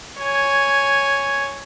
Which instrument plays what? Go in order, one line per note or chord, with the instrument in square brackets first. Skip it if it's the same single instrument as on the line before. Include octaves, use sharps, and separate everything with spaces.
[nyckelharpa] C#5 G#5